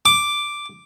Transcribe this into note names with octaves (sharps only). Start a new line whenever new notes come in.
D6